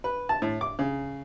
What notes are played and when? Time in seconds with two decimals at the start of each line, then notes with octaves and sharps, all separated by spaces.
0.04 B4
0.29 A5
0.42 A2
0.61 D6
0.79 C#3